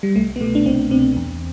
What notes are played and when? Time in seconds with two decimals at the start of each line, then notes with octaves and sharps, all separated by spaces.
0.03 G3
0.16 C2 A3
0.36 B3
0.41 B2 A3
0.55 D4
0.66 C2 C4
0.91 B2 C4
1.16 E2